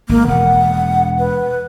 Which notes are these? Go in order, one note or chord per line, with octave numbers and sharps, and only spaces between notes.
G#1 A#3
E1 F#5
B4